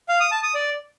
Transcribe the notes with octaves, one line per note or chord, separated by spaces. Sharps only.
F5
D#6
A5
D#6
D5